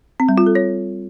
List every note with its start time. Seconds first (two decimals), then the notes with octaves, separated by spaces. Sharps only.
0.20 C4
0.29 G3
0.38 F4
0.46 A4
0.55 C#5